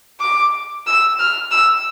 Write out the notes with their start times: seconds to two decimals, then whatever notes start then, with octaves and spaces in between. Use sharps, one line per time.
0.20 D6
0.87 E6
1.19 F6
1.51 E6